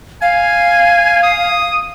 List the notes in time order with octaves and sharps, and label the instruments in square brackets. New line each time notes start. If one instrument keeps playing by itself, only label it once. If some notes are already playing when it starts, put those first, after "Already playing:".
[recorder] F5 [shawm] G#5
[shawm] D#6